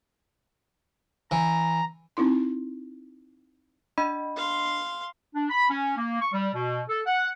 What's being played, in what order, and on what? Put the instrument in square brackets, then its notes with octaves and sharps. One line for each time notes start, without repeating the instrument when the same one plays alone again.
[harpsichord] E3 [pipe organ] A#5
[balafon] C4 D#4 E4 C6
[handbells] D4 D#5 B5
[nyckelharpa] F5 C6
[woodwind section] D4
B5
C#4
A#3
C#6
G3
B2
A4
F#5